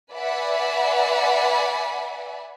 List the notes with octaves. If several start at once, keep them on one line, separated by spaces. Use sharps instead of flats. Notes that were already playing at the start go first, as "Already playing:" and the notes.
B4 D5 E5 F#5 G#5 B5